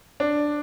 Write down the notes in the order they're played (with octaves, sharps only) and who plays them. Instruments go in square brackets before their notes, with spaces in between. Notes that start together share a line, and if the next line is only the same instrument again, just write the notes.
[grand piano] D4